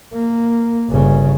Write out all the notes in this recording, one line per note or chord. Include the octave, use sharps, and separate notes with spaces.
A#3
G1 C#3